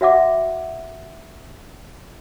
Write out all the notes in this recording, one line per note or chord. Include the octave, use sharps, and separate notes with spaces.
F#4 E5 F#5 D6